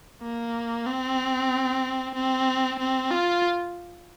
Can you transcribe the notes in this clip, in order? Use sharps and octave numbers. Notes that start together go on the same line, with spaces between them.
A#3
C4
C4
C4
F4